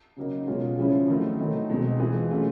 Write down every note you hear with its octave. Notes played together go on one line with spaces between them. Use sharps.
C#3 F#3 A#3 D#4
B2 G#3 C#4 F4
C#3 F3 G#3 C#4 E4
D#3 F#3 A3 C4 E4
D#3 F#3 A3 C4 D#4
B2 G#3 C4 D#4
E3 G#3 C4 F4
F#3 A3 C#4 F4